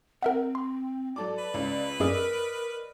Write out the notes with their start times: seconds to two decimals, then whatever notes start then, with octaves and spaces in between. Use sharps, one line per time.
0.23 C4 A#4 E5 F#5
0.55 C6
1.16 F#3 A4 D5 D6
1.39 B4
1.54 C#2 C#4
2.00 F#2 G#4 A#4 D5 D#5 E6